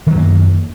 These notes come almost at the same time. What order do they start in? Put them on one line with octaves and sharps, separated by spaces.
D#3 F#3 F#2 A#3